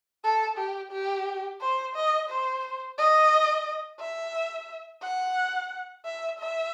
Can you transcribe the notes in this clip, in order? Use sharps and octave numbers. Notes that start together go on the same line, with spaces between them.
A4
G4
G4
C5
D#5
C5
D#5
E5
F#5
E5
E5